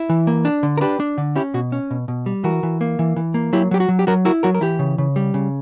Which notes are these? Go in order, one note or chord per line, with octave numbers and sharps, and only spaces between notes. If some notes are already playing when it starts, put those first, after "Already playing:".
Already playing: E4
E3
A#3
D4
D3
A#4
D4 G4 B4
D4
D3
C#4 E4 G4
B2 F#4
C#4
B2
B2
G3
E3 F#4 A#4
E3
A#3
E3
E3
A#3
F#3 E4 G4
F#3 G4
F#4
F#3
G4
F#3 F#4 A#4
E4 F#4 A#4
F#3 F#4 A#4
A#4
E3 E4 G4
C#3
C#3
G3
C#3